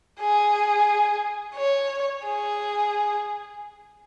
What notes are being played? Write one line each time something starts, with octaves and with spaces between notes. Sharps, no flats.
G#4
C#5
G#4